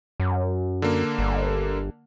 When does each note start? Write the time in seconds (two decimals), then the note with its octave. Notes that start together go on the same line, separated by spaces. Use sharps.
0.20 F#2
0.82 D3 A#3
1.19 G1